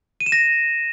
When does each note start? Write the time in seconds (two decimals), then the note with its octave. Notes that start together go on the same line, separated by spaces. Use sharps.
0.20 D#7
0.26 E7
0.32 A#6